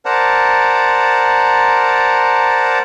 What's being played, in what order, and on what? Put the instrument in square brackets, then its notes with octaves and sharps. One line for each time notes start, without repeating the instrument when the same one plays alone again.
[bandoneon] A#4 C5 D5 F#5 A5 A#5